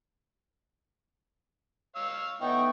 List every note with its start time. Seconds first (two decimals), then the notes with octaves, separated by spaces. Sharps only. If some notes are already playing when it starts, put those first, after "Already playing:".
1.95 C#5 F5 E6
2.41 A2 E3 B3 D#4 E4 G5 C#6